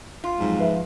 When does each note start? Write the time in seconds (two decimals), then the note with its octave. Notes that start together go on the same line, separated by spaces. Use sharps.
0.24 F4
0.40 F2 G#2 F#3
0.58 F3 B4 E5